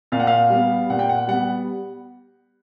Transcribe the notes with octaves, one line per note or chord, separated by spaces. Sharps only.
A#2 F5
F#5
F5
G3 B3
A#2 F#5
G5
F#5
G3 B3 F#5